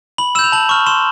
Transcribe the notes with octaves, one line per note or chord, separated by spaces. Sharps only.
B5 F#7
E6 G6 E7
F7
A5 F#7
C#6 F6
C6 E7